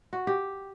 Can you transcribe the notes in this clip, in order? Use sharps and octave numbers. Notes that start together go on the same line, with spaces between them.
F#4
G4